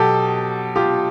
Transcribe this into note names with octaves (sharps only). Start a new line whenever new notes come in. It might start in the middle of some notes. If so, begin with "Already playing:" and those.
Already playing: B2 F#3 G4 A4
F4 G4